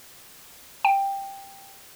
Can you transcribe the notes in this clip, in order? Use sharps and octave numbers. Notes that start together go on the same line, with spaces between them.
G5